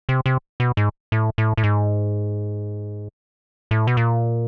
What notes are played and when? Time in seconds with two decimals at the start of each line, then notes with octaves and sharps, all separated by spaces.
0.09 C3
0.26 C3
0.60 B2
0.77 G#2
1.12 A2
1.38 A2
1.57 A2
1.63 G#2
3.71 A2
3.87 B2
3.97 A#2